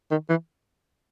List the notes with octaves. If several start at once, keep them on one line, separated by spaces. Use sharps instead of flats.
D#3
E3